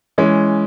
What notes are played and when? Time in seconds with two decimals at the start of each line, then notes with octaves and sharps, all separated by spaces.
0.18 E3 G#3 C#4